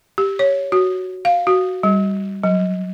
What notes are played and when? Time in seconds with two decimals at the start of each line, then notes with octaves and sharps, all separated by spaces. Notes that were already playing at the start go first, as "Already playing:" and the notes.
0.18 G4
0.39 C#5
0.72 F#4
1.25 F5
1.47 F#4
1.83 G3
2.44 F#3